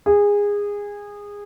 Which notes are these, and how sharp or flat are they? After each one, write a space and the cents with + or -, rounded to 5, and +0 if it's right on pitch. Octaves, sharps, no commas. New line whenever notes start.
G#4 -20